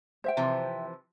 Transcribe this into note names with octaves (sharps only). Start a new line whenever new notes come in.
C5 E5 G5
C3 E3 F3